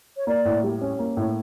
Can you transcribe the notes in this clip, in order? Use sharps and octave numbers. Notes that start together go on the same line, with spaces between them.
C#5
A#3 D5
A2
G3
C#4
A#3
A2